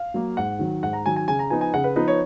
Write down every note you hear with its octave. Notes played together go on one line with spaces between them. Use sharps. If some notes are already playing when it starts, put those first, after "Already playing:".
Already playing: F5
F#3 A#3
G#2 F#5
D#3 F#3
G#2 F#5
A#5
D#3 F#3 G#5
G#5
C#3 G#5
A#5
F3 B3 D#4 G#5
G#5
C#3 F#5
B4
F3 B3 D#4 B4
C#5